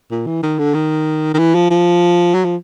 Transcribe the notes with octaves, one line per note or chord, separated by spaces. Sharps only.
A#2
E3
D#3
D3
D#3
D#3
E3
F3
F3
F#3
F3